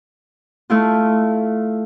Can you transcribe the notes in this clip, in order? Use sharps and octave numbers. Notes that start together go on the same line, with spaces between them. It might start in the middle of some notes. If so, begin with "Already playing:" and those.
A3 E4 F4